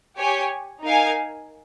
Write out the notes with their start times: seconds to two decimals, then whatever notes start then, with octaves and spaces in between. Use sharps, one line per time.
0.18 G4 C#5 G#5
0.84 D#4 A#4 F5 G#5